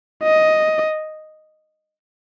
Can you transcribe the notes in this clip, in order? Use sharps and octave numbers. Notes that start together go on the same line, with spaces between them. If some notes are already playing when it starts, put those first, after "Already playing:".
D#5